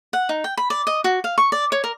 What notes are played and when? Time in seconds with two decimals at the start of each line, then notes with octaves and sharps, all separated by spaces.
0.13 F#5
0.29 D#4
0.44 G5
0.57 B5
0.70 D5
0.87 D#5
1.04 F#4
1.24 F5
1.38 C#6
1.52 D5
1.72 C#5
1.84 A#4